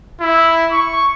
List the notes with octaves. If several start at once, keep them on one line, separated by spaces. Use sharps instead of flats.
E4
C#6